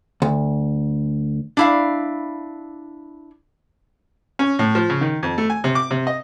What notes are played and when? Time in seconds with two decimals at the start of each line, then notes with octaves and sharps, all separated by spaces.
0.22 D2
1.57 D4 E4 F5
4.39 C#4
4.59 A2
4.75 F3
4.90 C#3
5.01 D#3
5.23 F2
5.38 A3
5.50 G#5
5.64 C3
5.75 D6
5.91 C3
6.07 D#5